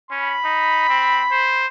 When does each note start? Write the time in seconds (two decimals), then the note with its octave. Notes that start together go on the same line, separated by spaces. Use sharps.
0.11 C#4 B5
0.45 D#4
0.89 C4
1.32 C5